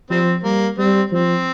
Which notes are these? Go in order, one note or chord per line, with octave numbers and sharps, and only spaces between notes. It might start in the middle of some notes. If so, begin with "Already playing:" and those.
F3 G3 C4
G3 A#3
G3 C4
F3 C4